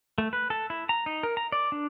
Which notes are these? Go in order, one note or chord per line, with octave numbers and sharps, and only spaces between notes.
A3
B4
A4
E4
A#5
D#4
A#4
A#5
D5
D4